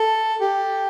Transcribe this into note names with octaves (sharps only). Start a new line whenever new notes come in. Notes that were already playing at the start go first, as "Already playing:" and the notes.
Already playing: A4
G4